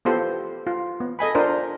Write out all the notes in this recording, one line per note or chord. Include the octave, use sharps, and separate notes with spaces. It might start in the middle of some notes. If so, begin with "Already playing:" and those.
B3 E4 F4 G4 A4 C5
F4
B3
A4 D#5 G#5 B5
D4 F4 A#4 C5